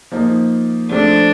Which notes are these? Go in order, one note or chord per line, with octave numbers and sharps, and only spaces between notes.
F3 A#3 D#4
F3 A3 C4 D4